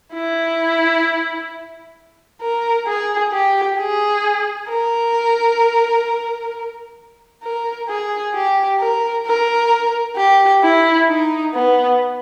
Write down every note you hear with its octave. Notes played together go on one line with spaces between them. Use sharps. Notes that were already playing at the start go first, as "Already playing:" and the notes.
E4
A#4
G#4
G4
G#4
A#4
A#4
G#4
G4
A#4
A#4
G4
E4
D#4
B3